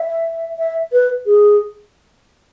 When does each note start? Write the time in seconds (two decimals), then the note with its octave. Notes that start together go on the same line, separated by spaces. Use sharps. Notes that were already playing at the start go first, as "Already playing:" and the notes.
Already playing: E5
0.59 E5
0.93 B4
1.26 G#4